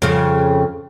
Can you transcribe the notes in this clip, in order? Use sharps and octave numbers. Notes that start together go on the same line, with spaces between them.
F2 C#3